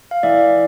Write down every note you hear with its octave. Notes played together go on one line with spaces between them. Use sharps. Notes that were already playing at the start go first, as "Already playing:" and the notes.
F5
E3 D5 E5